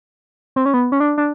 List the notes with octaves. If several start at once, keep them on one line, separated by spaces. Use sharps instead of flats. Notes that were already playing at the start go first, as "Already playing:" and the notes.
C4
C#4
B3
C#4
D4
D4